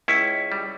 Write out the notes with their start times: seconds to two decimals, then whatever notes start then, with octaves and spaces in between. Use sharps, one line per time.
0.08 C#2 C#4 E4
0.52 G3